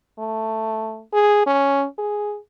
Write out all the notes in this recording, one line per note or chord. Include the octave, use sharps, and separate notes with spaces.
A3
G#4
C#4
G#4